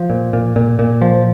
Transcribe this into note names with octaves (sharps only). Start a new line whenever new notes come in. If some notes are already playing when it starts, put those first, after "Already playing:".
Already playing: F3
A#2
A#2
A#2
A#2
F3